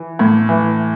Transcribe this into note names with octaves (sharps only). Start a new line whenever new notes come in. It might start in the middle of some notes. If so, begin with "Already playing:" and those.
Already playing: E3
A2
E3